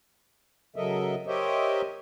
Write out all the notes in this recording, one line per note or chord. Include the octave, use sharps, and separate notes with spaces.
C#3 F#3 A4 A#4 D#5 E5
G4 A#4 C5 C#5 D#5 E5